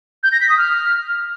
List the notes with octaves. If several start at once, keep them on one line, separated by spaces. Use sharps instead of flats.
G6
A#6
B6
D#6
F6